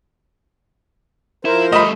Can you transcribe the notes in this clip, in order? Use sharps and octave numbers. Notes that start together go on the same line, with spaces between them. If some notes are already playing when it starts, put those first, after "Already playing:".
F3 E4 A#4 C5
G3 A3 D#5 B5